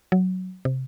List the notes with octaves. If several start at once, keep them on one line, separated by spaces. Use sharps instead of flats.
F#3
C3